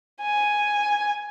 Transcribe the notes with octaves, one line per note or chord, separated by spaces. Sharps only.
G#5